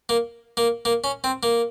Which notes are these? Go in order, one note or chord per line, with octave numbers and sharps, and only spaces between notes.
A#3
A#3
A#3
C#4
C4
A#3